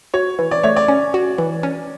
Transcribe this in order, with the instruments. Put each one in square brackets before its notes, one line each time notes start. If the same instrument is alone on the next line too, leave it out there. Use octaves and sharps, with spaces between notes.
[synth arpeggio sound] F#4 [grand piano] C#5
[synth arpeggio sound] E3
[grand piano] D5
[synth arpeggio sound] A3 [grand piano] C#5
[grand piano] D5
[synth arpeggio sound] C#4
F#4
E3
C#4